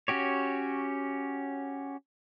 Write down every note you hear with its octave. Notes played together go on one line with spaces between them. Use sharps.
C#4 F#4 G4 C#5